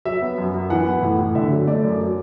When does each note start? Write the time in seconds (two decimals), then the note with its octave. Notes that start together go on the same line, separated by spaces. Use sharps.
0.05 F#3 E5
0.22 B3
0.38 F#2
0.54 F#2
0.70 E3 F#5
0.86 B3
1.02 A2
1.19 A2
1.35 D3 E5
1.51 F#3
1.67 A3 D5
1.84 F#2
2.00 F#3